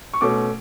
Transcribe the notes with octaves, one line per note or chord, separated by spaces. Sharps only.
C#6
B2 A3 C#4 D6